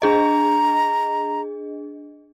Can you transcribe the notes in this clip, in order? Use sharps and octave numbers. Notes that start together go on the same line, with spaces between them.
D4 G#4 D#5 A#5